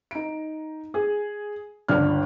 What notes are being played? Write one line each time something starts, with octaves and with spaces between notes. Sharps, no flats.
D#4 D7
G#4
G1 C#2 D4 F6